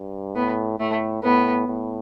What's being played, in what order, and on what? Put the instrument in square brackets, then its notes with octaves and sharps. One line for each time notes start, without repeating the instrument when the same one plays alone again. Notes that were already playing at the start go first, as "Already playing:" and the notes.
Already playing: [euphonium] G2
[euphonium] A2 [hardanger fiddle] B3
[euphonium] A2 [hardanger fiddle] A3
[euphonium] A2 [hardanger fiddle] B3
[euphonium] A2